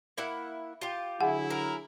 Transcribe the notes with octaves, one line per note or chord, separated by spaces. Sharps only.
A#3 E4 F#5
F4 G4
D3 F#3 E4 G#4 F#5
A#4